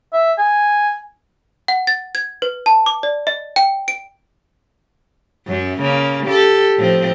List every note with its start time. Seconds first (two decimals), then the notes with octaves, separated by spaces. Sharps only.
0.13 E5
0.38 G#5
1.68 F#5
1.87 A6
2.15 G#6
2.42 B4
2.66 A5
2.86 D6
3.03 D5
3.27 D#5
3.56 G5
3.88 D7
5.48 F#2 F#3
5.82 C#3 A#3
6.26 G4 A4
6.77 A2 F3 C4